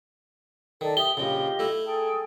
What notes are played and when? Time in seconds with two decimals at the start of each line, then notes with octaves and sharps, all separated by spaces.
0.81 D#3 A4 D5 D#5
0.97 G4 E5 D#6 G7
1.17 A#1 C#3 F4 G4 D#5
1.59 A3 E4
1.84 G#4 A4 G5